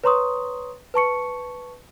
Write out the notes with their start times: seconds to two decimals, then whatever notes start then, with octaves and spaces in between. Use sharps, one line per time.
0.04 B4 C#5 A#5 C6 C#6 D#6
0.94 B4 A5 C#6 C#7